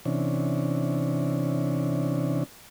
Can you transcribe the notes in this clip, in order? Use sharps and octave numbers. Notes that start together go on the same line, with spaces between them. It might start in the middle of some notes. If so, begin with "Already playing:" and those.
C3 E3 C#4 D4